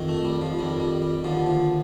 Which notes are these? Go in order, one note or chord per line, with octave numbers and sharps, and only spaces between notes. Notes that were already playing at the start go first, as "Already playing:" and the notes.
Already playing: F2 D#3
A3
G3
F3
F2 D#3 G3
G3
G3
D#2 D3 F3
F3